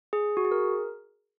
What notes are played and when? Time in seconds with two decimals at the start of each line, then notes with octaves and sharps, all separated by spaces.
0.13 G#4
0.37 F#4
0.45 G#4
0.52 A#4